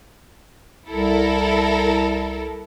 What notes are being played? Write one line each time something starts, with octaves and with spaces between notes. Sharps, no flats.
C2 E4 A4 A#4